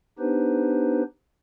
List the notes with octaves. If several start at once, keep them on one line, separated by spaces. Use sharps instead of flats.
B3 D4 D#4 G4 B4 C5